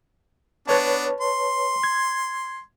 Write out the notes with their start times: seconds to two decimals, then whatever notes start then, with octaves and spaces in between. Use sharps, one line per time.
0.67 B3 D4 B4 C#5 A5
1.20 C6
1.84 G#6